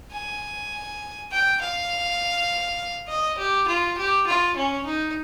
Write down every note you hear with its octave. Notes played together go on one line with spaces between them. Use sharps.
G#5
G5
F5
D#5
G4
F4
G4
F4
C#4
D#4